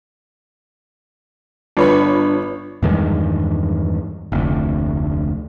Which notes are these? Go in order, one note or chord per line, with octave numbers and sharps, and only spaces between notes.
G1 D4 F4 B4 C#5 G5 B5
E2 G2 D#3 G#3
F1 D2